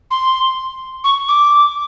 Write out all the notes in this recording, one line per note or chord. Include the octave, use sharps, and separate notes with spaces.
C6
C#6
D6